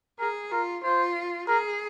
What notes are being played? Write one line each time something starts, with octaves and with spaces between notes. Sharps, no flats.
G#4 A#4
F4 A#4
F4 C5
G#4 A#4